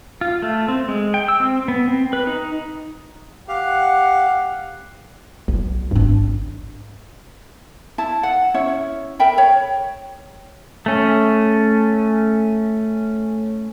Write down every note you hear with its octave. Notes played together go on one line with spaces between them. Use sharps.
F4
A3
C4
G#3
G5
E6
C4
B3
C4
B4
D#4
G4 F5 F#5
B1 F#3
G#1 G2 D4
E4 A5
F#5
C#4 E4 C#5
A#4 E5 G5 B5
C#5
A3 C#4